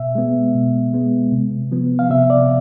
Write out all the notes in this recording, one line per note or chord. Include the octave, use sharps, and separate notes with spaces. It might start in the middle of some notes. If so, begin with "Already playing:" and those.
Already playing: B2 E5
G#3 B3
B2
G#3 B3
C3
F3 B3
F5
C3 E5
D5